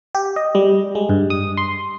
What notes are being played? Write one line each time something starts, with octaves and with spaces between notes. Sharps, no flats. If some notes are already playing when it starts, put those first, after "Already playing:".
G4
D#5
G3
G#3
G2
D#6
C6